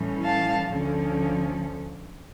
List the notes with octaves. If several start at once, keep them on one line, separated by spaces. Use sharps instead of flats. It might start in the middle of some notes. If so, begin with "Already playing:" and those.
Already playing: A2 E3 G3 C#4
F5 A5
D2 D3 F3 C#4